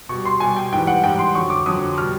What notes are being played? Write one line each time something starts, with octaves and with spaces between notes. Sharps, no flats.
B2 G3 C#6
C6
B2 G3 G#5
G5
G#2 E3 G3 G5
F#5
G#2 E3 G3 G5
C6
F2 D3 F#3 C#6
D6
F2 D3 F#3 D#6
B2 G3 F6